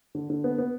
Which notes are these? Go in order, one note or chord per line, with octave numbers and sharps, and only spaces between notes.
D3
D3
B3
B3